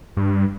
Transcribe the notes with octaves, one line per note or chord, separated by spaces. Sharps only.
G2